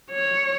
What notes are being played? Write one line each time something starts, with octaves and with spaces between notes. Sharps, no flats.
C#5